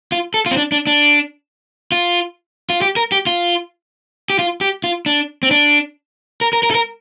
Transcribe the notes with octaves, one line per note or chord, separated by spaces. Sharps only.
F4
A4
F4
C4
D4
D4
D4
F4
F4
G4
A#4
G4
F4
G4
F4
G4
F4
D4
C4
D4
A#4
A#4
A#4
A4
A#4